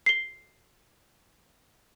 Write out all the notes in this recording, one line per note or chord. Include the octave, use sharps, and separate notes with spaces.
C7 G7